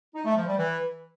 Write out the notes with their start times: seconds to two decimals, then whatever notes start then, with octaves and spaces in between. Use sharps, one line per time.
0.14 D#4
0.25 A3
0.36 F3
0.47 G3
0.58 E3